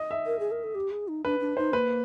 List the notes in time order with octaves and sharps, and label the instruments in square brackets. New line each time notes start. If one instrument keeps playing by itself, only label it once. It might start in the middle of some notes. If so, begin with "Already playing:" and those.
Already playing: [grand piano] D#5
E5
[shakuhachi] A#4
G#4
A#4
A4
G4
G#4
D#4
[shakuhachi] D4 [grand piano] B4
[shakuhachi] D4
[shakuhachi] D#4 [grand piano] C5
[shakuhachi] A#3 [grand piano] B4